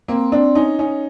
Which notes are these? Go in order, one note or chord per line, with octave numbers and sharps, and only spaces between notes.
A#3 C4
C4 D4
C#4 D#4
C#4 D#4